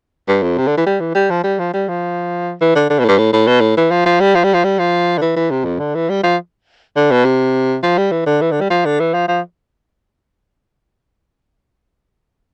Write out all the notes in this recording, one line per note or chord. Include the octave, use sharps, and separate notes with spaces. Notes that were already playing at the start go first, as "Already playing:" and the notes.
G2
F2
C3
D3
E3
G3
E3
G3
F3
G3
F3
G3
F3
E3
D3
D3
B2
A2
G2
A2
A2
B2
A2
E3
F3
F3
G3
F3
G3
F3
G3
F3
D3
E3
E3
C3
F2
D3
E3
G3
F3
D3
B2
C3
F3
G3
E3
D3
E3
D3
G3
F3
D3
E3
F3
F3